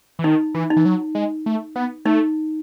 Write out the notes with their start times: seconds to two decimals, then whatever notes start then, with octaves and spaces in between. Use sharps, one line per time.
0.19 E3
0.24 D#3 D#4
0.54 E3
0.70 D#4
0.76 E3
0.85 F#3
1.15 G#3
1.46 A3
1.76 B3
2.05 A3 D#4